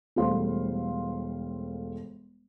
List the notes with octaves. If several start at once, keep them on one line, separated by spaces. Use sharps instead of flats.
E1 G3 A3 C5 F5 C6